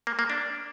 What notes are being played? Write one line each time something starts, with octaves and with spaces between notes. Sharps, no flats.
A#3
A#3
D4